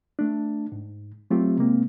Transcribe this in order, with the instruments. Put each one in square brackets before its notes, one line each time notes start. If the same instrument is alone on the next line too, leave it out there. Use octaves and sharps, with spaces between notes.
[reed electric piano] A3 D4
G#2
F#3 A3 C4 F4 G4
C3 G#3 A#3 C4